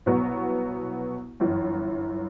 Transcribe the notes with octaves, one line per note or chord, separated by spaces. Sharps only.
C2 B2 F#3 B3 F#4
G1 F#2 E3